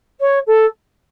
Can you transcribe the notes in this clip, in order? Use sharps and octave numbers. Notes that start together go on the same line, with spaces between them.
C#5
A4